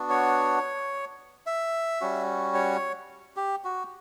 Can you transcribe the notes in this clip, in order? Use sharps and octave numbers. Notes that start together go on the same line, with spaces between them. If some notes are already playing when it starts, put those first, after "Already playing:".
Already playing: B3 D4 F#4
C#5
E5
G3 C#4 F#4
C#5
G4
F#4